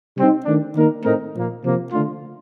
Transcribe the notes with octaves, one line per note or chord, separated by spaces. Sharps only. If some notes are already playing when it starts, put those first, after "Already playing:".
C3 G3 C4 D#4
D#3 A3 D4
D#3 A#3 D#4 A#4
A2 A3 C4 D#4 A#4
A#2 F3 A#3
C3 F3 A#3
D3 A3 D4 F4